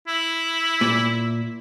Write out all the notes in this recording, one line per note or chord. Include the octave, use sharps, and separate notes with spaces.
E4
A#2